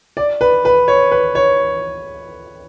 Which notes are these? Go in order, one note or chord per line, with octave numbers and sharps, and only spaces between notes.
D5
B4
B4
C#5
B4
C#5